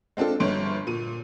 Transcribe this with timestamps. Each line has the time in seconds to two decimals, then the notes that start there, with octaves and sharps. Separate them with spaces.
0.17 G#3 C4 D4 F4 A4
0.40 G1 G2 C#5 C6 D7
0.87 A#2 D#7